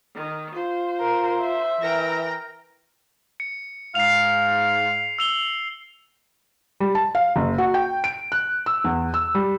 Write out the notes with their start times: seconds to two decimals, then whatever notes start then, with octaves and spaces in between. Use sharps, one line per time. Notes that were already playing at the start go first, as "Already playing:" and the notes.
0.15 D#3
0.54 F4 C5
1.01 A#4
1.42 E5
1.81 E3 A#4 G5 A#6
3.40 C#7
3.95 G#2 F5 C7 F7
5.19 E6 F7 G7
6.80 G3
6.95 A5
7.15 F5
7.36 F#1
7.58 F#4
7.74 G5
8.04 D7
8.32 F#6
8.66 E6
8.84 E2
9.14 E6
9.35 G3